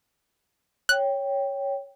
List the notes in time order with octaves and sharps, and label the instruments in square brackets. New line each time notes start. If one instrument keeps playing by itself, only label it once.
[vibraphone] C#5 G5 [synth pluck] F#6